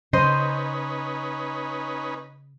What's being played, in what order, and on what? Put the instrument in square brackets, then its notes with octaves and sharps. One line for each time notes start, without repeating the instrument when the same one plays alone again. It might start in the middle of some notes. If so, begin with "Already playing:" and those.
[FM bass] C#3 [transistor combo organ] C#4 D#4 B4 [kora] C5 D#5